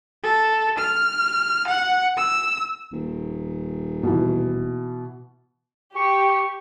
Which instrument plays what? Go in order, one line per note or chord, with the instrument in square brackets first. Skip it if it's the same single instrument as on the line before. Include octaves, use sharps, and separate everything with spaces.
[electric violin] A4
F6
F#5
E6
[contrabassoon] D#1
[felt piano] B2 E3
[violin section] G4 [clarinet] C#6